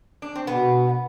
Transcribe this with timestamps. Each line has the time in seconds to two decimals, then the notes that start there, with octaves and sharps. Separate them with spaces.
0.22 D4
0.36 C4
0.47 B2 B3